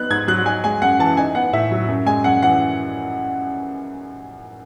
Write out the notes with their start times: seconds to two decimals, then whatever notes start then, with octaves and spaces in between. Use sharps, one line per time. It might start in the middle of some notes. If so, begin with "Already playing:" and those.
Already playing: B3 D#4 F#6
0.10 G#2 G#6
0.28 F#3 F#6
0.46 D#4 G#5
0.64 G#3 G#5
0.82 F#2 F#5
0.99 E3 A5
1.17 D#4 G#5
1.35 B3 F#5
1.53 A2 E5
1.71 F#3
1.88 F#2
2.06 G#3 G#5
2.24 F#2 F#5
2.42 E3 F#5